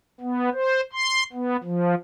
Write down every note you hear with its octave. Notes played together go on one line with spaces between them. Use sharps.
B3
C5
C6
B3
F3